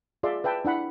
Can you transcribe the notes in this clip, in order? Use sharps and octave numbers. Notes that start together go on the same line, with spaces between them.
F4 G#4 D5 E5 C6
B4 E5 G5 A5
D4 E4 F#5 B5